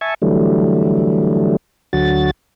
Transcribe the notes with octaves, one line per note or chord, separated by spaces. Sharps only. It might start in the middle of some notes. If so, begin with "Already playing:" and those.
E5 G#5 A5 C#6
D3 E3 F#3 G3 A3
D2 D3 F#3 F#4 A6